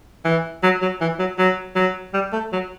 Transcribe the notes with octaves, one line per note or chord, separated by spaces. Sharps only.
E3
F#3
F#3
E3
F#3
F#3
F#3
G3
A3
F#3